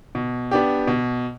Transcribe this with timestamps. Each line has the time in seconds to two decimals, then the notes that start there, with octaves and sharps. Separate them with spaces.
0.15 B2
0.51 B3 D4 G4
0.87 B2